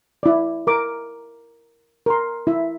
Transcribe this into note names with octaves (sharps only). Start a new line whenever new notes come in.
E4 D5
A#4 D6
A#4 C6
E4 E5